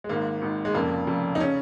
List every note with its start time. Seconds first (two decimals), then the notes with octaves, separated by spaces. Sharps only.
0.04 G#3
0.09 G#1 G#2 D#3 A#3
0.41 G#1 G#2 D#3
0.65 G#3
0.74 F1 F2 C#3 A#3
1.07 F1 F2 C#3
1.35 D#4
1.40 C#3 C#4